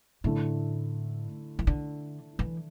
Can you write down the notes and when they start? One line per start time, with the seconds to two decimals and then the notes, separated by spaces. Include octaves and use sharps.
0.24 A2 D3 A3 E4
1.59 E3
1.67 D3
2.39 E3